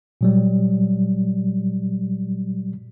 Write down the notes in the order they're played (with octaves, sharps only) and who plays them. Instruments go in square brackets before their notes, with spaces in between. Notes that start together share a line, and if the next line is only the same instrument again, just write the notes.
[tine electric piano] A#2 F#3 G3